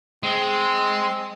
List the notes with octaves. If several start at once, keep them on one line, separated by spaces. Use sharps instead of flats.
G#3 C4 C6